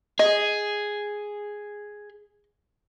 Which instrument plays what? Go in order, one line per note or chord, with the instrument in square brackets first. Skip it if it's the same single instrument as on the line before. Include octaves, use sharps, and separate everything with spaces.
[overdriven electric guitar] G#4 [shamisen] D#5